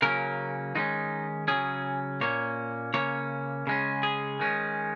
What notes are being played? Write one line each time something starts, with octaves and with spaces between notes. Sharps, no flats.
C#3 F#3 A#3 C#4 A#4
D#3 G#3 C#4 D#4
C#3 F#3 C#4 G#4
A#2 A#3 C#4 C#5
C#3 A#3 C#4 C#5
C#3 G#3 C#4
G#4
D#3 G#3 C#4